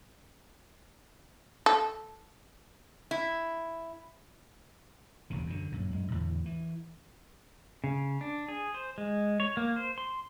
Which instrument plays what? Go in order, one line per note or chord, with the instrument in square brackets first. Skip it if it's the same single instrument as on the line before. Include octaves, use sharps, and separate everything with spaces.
[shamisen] A4
[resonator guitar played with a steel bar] E4
[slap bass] E1 D2 C#3
F#2 D3
F#2 A#2
F#2 G#3
E2 A2 D3
E3
[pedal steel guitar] C#3
D4
G#4
C5
G#3
C#5
A#3
C5
C6